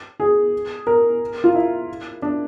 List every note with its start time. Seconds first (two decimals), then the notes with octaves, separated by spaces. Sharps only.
0.20 G#4
0.87 A#4
1.44 F4
1.55 E4
2.22 D4